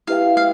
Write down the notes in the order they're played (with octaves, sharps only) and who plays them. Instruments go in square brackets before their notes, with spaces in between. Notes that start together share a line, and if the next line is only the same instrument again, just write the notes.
[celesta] E4 G4 B4 E5 G5 [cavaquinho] F5
[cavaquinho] F5